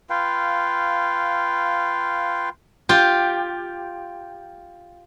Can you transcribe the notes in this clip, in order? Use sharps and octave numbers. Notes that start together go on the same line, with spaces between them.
F4 B4 F5 G5
F4 G4